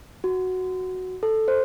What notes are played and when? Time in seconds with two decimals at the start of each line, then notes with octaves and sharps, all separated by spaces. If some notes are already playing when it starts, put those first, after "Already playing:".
0.24 F#4
1.23 A4
1.48 C5